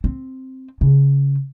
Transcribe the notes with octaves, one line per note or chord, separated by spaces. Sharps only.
C4
C#3